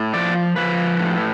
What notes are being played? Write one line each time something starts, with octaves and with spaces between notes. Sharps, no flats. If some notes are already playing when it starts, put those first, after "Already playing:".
Already playing: A2
F3 D5
F3 B4
A2